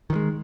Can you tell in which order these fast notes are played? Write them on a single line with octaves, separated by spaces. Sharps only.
D#3 E3 G#3